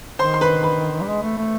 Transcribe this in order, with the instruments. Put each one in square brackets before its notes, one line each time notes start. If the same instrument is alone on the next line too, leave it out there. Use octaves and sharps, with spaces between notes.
[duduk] D#3 [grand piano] C5 C6
[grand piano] C6
B4 B5
B4 B5
[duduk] G3
G#3
A3
A3